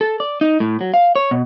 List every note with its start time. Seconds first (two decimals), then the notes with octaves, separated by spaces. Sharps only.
0.01 A4
0.20 D5
0.41 D#4
0.60 A2
0.81 F#3
0.94 F5
1.16 C#5
1.31 B2